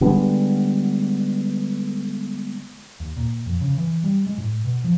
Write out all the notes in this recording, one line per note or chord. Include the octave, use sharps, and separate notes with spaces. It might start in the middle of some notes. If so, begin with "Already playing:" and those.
D3 G3 G#3 B3
D#2
A#2
F2
C#3
E3
G3
G#3
A2
B2
F3